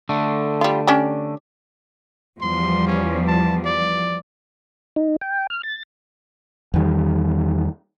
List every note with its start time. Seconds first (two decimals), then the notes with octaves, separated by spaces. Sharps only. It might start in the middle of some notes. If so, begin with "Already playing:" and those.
0.09 D3 A3
0.61 G3 F4
0.87 C#4 D4 G4
2.41 E2 F3 G3 C6
2.87 C#4
3.27 A5
3.65 D5
4.96 D#4
5.21 G5
5.50 F6
5.63 A6
6.74 E2 D#3 G3